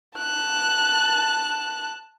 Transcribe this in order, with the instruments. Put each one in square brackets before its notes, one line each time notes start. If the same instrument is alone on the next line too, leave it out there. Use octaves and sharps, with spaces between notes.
[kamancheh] A5 F#6